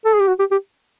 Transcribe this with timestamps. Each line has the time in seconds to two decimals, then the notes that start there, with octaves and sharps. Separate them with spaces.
0.05 A4
0.13 G#4
0.20 G4
0.27 F#4
0.39 G4
0.51 G4